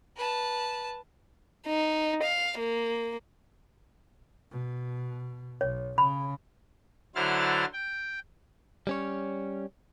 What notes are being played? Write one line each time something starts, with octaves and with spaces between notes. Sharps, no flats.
B4 A5
D#4
F5
A#3
B2
B1 C#5
C#3 B5
D3 F#3 E4 C5 F6 A6
G5
G3 C#4 C#5